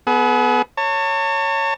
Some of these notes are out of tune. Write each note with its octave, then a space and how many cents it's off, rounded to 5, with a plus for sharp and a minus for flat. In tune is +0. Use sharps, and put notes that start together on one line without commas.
B3 +0 G#4 +40
C#5 +0 A5 +40